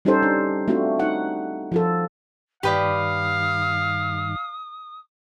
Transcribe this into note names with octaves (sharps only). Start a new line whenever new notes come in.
G3 C#4 D#4 G4 A4 C5
D4
A3 C4 D4 F4 F#4
D#4 F#5
F3 F4 A4
G2 D#3 G4 B4 D5 F5 D#6